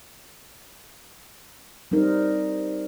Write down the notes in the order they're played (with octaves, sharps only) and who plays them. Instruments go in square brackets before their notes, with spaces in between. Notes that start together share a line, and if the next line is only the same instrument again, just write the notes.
[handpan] G3 C4 D#4 A#4